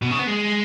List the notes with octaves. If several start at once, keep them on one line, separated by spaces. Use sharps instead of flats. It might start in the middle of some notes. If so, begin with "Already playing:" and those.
B2
C#3
B3
G#3